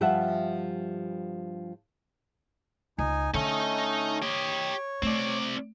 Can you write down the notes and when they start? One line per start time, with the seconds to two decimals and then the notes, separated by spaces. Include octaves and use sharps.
0.01 G2 F3 G3 E5 F#5 A5
2.98 C#2 D#4 G#5
3.34 D3 A3 C#4 D#4 D#5
4.22 G4 C#5 D#5
5.02 A3 C4 D5